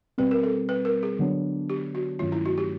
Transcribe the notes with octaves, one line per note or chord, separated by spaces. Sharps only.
B2 G3 C4 B4
A#4
A4
B4
A#4
G#4
D3 F#3 B3 D4
G4
F#4
G2 D#3 F#3 A3 C#4 F4
E4
F#4
G4